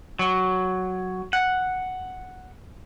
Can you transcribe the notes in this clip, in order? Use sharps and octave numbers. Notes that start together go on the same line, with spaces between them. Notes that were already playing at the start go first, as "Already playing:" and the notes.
F#3
F#5